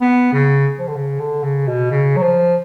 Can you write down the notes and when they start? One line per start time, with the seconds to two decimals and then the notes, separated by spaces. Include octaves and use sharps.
0.01 B3
0.33 C#3
0.79 F3
0.87 D3
0.96 C#3
1.20 D3
1.43 C#3
1.67 B2
1.91 C#3
2.16 F#3
2.22 F3